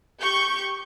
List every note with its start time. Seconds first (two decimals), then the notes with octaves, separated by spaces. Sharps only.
0.20 G4 C#6 G6